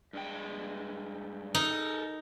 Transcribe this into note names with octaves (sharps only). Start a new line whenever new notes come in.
G2 G#3 G5
D#4 A4 A#4